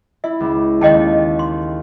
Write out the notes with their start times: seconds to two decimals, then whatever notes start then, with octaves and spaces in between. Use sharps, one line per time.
0.24 E4 E5
0.40 C#2
0.81 D#2 D#5 G5 A5
1.39 C6